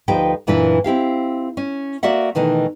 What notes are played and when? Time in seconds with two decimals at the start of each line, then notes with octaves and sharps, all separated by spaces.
0.08 D2 F3 D#4 G4 B4 G5
0.47 F#2 A#2 E3 D4 E4 B4
0.84 C4 E4 G4 F5
1.57 C#4
2.03 A#3 F#4 D5 E5 F#5
2.35 B2 D#3 E3 A3